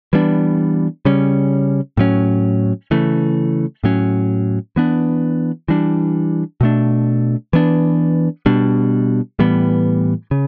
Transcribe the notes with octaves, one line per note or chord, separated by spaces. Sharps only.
E3 G3 B3 D4
C#3 G3 C#4
A2 F#3 C#4
C#3 E3 A3
A2 F#3 C#4
E3 B3 D4
E3 G3 D4
B2 A3 D4
E3 B3 D4
B2 G3 D4
A2 E3 G3 B3
C#3